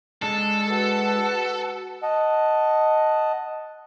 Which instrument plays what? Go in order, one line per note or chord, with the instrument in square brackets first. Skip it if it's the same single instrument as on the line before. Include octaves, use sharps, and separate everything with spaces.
[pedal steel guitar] G#3 D4 [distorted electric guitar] A4
[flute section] F#4 B4 F#5
[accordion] D#5 F#5 A5